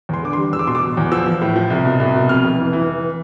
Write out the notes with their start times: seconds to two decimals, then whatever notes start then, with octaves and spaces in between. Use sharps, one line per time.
0.09 E2 C6
0.23 D3 D6
0.33 C6
0.38 G3
0.52 E2 E6
0.59 D6
0.67 B2 C6
0.75 D6
0.81 B2
0.97 E2
1.12 F3 E6
1.26 F3
1.41 A2
1.56 F3
1.70 C2
1.85 B2
2.00 C2
2.15 B2
2.29 F2 F6
2.44 F1
2.58 E3
2.73 E3
2.87 F1